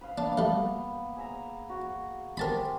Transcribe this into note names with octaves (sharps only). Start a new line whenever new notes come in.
B4 F5
A#3 B3 D4
G3 A3
G#4 E5 A#5
F#4
G#3 C4 G4 A#4 A5 B5